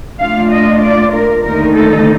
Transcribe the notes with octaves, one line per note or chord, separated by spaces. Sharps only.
A#2 A3 D4 F4 F5
D#5
D5
A#4
D#2 D3 A3 D#4 A#4
A4